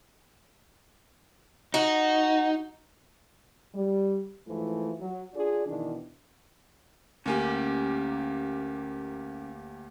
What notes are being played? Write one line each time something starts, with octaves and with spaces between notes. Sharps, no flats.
D#4 F#4
G3
G#2 E3 F3 A3
F#3
D4 F4 G#4 D5
B2 D#3 E3 D4
D2 A#3 C#4 G4 G#5